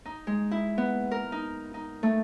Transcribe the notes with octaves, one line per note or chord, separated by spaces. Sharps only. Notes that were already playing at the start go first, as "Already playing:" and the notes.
D#4
G#3
E4
B3
A#4
D#4
D#4
A3